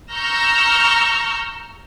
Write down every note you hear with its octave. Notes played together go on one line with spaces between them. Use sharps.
A#5 C#6 E6 F6 G6 A#6